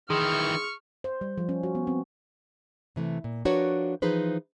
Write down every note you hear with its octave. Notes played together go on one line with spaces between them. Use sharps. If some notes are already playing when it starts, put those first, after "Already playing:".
D#3 E3 G#4 C6 C#6 D#6 F6
C5
G3
F3
C#4
F#4
B3
C4
C3 E3 A3
A#2
F3 D4 F#4 A#4 B4 C#5
E3 F3 D#4 G#4 B4 C5